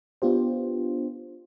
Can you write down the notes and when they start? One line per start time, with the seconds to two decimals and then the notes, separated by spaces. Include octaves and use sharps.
0.22 B3 D4 F4 G4 C5